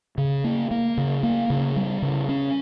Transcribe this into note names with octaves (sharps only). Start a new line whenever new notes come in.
C#3
A#3
A#3
C#3
A#3
C#3
G3
C#3
C#4